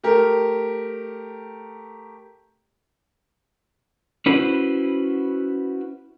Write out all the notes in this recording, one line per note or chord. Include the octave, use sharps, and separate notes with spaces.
A3 G4 A#4
C#4 E4 F#4 B4 C5